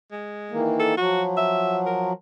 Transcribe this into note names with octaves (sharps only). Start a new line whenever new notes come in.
G#3
D#3 E3 A#3
A4
F3 F#3 F#4
E5
A#4